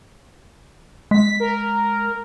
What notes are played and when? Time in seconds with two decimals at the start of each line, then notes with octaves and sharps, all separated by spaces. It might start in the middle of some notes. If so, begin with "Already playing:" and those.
1.11 G#3 B6
1.40 A#4